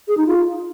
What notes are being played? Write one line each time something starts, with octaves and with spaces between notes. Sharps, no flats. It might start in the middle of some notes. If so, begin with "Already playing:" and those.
G#4
D#4
F4